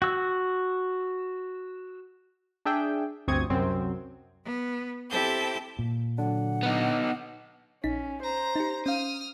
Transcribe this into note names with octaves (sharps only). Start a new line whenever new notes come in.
F#4 E6
D4 G#4 E5 G5
G1 D2 C4 C#6 D#6 G#6
C2 F#2 C4
B3
C4 E4 G4 A4 A5 G6
A#2
D3 F#3 D4 F#5
B3 D#4
A#1 C#4 D#4 B6
C5 A#5
D#4 G4
C#4 F5 D#6 F6